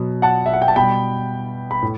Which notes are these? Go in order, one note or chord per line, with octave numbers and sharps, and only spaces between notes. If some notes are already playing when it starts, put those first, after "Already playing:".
Already playing: B2 F#3
F#5 A5
E5
F#5
G5
A5
B2 G3 G5 B5
B5
A2